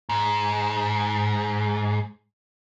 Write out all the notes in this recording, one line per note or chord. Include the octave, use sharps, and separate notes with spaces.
G#2